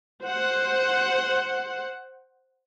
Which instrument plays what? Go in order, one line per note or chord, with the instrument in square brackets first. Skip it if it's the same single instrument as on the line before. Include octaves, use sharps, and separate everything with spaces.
[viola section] C5 F#5